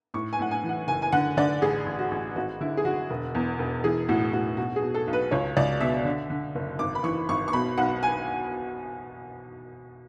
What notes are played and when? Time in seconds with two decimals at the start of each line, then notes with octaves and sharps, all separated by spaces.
0.14 A2 C#6
0.33 G#5
0.39 A2 F#5
0.51 G#5
0.63 E3
0.69 F#5
0.88 F#1 G#5
1.02 G#5
1.12 D3 F#5
1.37 D3 D5
1.62 A1 G#4
1.86 A1
1.99 F#4
2.11 A1
2.35 G#1 F#4
2.61 D3 E4
2.77 G#4
2.85 D3 F#4
3.10 E1
3.35 E2
3.59 E1
3.84 E3 G#4
4.08 A2 F#4
4.32 A2 F#4
4.57 B2 F#4
4.76 G#4
4.82 B2
4.94 A4
5.07 B1
5.13 B4
5.31 C#2 C#5
5.57 C#2 D5
5.80 B2 E5
6.05 D3
6.30 D3
6.55 F#1
6.79 G#1 D6
6.95 B5
7.03 E3 C#6
7.29 G#1 C#6
7.48 C#6
7.53 B2 B5
7.78 B1 F#5
8.03 G#5